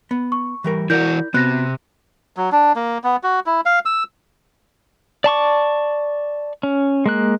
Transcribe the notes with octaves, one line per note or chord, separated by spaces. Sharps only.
B3
C#6
E3 G3 A#4
E3 E4 F#4 A#4 D5 G6
C3 B3 F#4 F#6 A#6
F#3
D4
A#3
B3
F#4
E4
F5
E6
D5 A5 C#6 D6
C#4
G#3 A#3 F#6